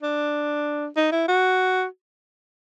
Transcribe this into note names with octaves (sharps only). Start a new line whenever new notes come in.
D4
D#4
E4
F#4